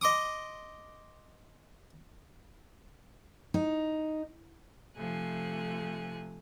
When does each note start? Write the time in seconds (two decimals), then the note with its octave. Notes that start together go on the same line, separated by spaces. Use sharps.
0.01 D#5 C6 D6 D#6
3.54 D#4
4.97 C3 F3 A3 G#5 F#6